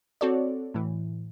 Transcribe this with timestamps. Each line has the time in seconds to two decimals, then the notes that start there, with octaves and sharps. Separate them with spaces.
0.21 C4 F#4 A4 C#5 D5
0.74 A2 E3